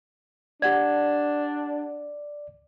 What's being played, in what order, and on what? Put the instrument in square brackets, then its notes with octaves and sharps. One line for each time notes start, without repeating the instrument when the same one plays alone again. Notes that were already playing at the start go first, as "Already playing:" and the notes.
[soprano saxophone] D4 [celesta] G4 F#5 G#6 [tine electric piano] D5